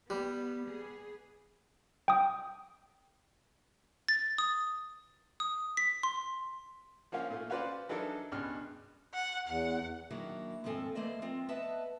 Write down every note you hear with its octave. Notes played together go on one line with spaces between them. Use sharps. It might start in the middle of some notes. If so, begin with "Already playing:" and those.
G3 B3
B3 G#4
G5 D#6
A6
D#6
D#6
B6
C6
F3 A#3 C#4 F4
A#2 A3
C#4 F4 F#4 B4 C5 D5
E3 F#3 D4 D#4 A4 A#4
C#2 G2 B2 F6
F#5
E2 F#5
D#3 F#3 A#3 D4 E4
D#2 G#2 F3 C4 A4 G#5
E3 A3 A#3 C5 D5 D#5
F3 C4 F4
B3 B4 D#5 E5 F#5 A5